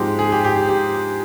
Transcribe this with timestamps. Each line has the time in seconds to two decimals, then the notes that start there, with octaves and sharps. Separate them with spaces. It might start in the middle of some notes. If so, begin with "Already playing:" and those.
Already playing: G#2 F3 G#3 C4 G4
0.19 G#4
0.32 G4
0.44 G4
0.56 G4
0.69 G4